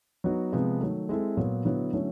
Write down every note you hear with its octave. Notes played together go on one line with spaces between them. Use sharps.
F#3 B3 D#4 F#4
C3 F3 G#3 B3
D#3 F#3 A3
G#3 C4 E4 A4
A#2 F#3 B3
D3 F#3 B3 E4
D3 F#3 A3 C#4 E4